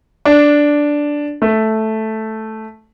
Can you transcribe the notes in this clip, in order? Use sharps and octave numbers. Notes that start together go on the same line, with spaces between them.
D4
A3